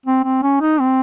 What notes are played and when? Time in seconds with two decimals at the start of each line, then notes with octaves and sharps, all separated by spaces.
0.06 C4
0.24 C4
0.43 C#4
0.61 D#4
0.80 C4